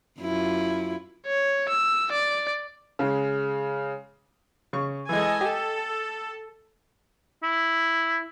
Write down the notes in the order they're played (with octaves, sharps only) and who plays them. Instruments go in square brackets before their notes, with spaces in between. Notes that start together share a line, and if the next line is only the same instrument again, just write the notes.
[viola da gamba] F#2 E4 F4
[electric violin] C#5
E6
D5
[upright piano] C#3 G#3
[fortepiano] C#3 C#6
[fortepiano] E3 G#3 [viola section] A4 D#5 G#5
[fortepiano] G4 [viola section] A4
[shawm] E4